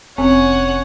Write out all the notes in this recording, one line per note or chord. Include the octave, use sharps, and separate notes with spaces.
F1 C4 C#4 C#5 F#5 G#5